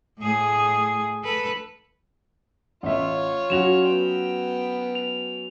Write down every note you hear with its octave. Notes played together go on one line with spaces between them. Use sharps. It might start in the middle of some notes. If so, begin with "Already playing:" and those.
A2 G#4
A4 B4
A1 F4 C#5 E5
F#3 C#4 F#4 E7 F7
B3 G5
F7